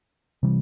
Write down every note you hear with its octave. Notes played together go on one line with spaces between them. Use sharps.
C3 E3 G3